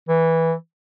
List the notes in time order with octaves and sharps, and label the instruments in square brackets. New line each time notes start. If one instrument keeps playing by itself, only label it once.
[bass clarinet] E3